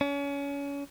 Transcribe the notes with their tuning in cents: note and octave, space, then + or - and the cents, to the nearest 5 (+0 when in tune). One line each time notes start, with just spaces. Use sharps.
C#4 +30